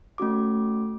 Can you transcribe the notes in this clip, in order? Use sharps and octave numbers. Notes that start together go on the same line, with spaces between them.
A3 C#4 F#4 D6